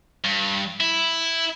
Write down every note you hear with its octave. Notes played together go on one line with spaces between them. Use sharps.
G2
E4